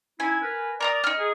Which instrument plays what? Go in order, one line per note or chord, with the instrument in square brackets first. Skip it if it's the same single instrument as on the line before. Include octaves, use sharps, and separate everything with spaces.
[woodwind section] C#4 D#4 E4 [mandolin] G#5
[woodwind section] A#4 B4
[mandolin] A#4 A#5 D#6 [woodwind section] D5
[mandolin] D#4 F6
[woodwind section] G#4